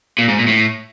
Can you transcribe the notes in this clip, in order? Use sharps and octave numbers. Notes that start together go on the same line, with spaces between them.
A#2
G#2
A#2
A2